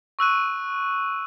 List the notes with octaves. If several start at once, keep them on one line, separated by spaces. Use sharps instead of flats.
C#6 E6 F#6 D#7